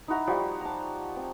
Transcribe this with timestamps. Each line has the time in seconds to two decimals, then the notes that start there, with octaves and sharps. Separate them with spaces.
0.08 D#4 E4 F#4 A#5
0.27 F3 G3 F#4
0.61 A5 A#5
1.16 C4